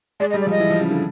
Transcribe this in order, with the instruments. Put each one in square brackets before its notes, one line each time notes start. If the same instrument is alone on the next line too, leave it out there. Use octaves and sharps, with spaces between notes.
[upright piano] G#3 [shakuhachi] D5
[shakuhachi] D#5
[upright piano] G3
[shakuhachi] D5
[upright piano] F3 [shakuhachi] D#5
[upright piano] E3
F3
C#3
D3